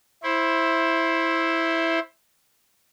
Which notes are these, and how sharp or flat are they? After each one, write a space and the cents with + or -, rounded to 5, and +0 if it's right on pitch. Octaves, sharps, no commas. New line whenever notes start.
E4 +0 C5 +15